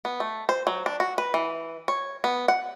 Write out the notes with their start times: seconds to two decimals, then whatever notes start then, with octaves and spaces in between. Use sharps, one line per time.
0.05 B3
0.20 A3
0.49 C5
0.67 F#3
0.86 D4
1.00 F#4
1.18 B4
1.34 E3
1.88 C#5
2.24 B3
2.48 F#5